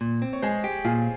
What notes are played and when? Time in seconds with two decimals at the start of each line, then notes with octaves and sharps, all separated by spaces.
0.01 A#2
0.22 C4
0.33 C#5
0.42 G#3 G#4 C5
0.64 G4
0.85 A#2 F4 G#4